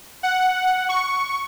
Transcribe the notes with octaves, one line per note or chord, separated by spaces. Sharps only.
F#5
C#6